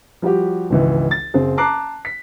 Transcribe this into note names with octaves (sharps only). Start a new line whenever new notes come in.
F3 G3 F#4 G4
G#1 C#2 E3
A6
F#1 C4 G#4
A5 A#5 D6 F#6 C7
B6